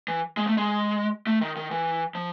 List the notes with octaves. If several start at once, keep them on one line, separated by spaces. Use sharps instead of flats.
E3
G#3
A3
G#3
A3
D#3
D#3
E3
F3